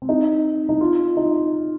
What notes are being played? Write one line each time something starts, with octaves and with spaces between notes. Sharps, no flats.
C4
D#4
D#4
F4
D#4